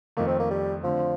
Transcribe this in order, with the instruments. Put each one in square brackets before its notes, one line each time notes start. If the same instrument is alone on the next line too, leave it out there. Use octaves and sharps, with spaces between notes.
[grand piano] F2 D#3 A3 [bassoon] A#3
[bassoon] C4
A#3
G3
[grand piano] D3 A3 C4 [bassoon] F3